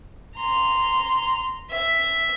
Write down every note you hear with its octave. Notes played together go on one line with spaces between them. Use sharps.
A#5 C6
E5